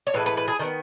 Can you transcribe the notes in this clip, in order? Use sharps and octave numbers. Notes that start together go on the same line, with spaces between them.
C#5
A2 E3 G#3 B4
B4
B4
G#4
D#3 G#3 B3